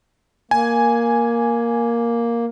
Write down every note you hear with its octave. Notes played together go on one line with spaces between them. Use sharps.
A#3 G#5